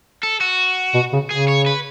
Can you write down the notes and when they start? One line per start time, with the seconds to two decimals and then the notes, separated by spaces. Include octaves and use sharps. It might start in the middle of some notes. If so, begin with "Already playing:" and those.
0.23 A4
0.41 F#4
0.94 B2
1.13 C#3
1.30 C#3 G#4
1.48 C#5
1.66 B4